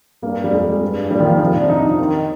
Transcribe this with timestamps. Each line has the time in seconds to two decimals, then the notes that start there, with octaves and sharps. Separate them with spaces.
0.23 G2 A#3
0.44 G3
0.53 F2 G#3
0.82 G2
1.11 A#2 G3
1.20 D#3
1.25 F3
1.40 C3 F3
1.55 D4
1.70 D#4
1.85 F4
1.99 D#3 D#4